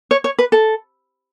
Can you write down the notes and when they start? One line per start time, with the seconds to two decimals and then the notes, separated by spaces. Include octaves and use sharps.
0.11 C#5
0.24 C#5
0.39 B4
0.52 A4